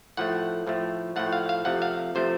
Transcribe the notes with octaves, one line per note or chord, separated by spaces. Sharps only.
A2 F3 A3 F#5
A2 F3 A3
A2 F3 A3 F#5
F5
F5
C3 F3 A3 F#5
F5
C3 F3 A3 C5